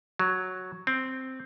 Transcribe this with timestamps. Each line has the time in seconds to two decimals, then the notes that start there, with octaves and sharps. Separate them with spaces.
0.19 F#3
0.87 C4